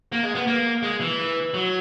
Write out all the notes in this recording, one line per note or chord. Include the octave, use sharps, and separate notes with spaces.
A#3
G#3
B3
A#3
G#3
E3
F#3